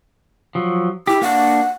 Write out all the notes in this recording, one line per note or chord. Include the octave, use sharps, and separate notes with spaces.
F3 F#3
E4 G4
A#3 D4 F#5